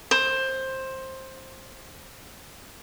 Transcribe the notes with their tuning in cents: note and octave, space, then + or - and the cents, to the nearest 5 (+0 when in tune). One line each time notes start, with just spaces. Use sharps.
C5 +15